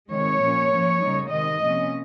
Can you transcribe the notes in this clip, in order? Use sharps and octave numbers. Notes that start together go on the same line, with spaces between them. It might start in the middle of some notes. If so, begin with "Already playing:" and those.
C3 D#3 G#3 C#5
A#2 F3 A#3 C#4
F3 A#3 C#4
C#3 G3 A#3 D#4
C3 D#3 G#3 D#5
C3 F3 A#3 C#4